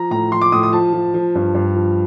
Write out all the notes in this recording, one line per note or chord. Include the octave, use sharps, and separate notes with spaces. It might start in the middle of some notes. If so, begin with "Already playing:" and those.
Already playing: F3 A#5
A2 A#5
F3 C6
D6
A2 D#6
D#6
F3 A5
F3
F3
G2
G2
F3